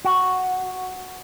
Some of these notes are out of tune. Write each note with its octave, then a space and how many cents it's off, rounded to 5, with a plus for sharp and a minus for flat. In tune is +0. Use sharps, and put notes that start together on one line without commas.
F#4 +0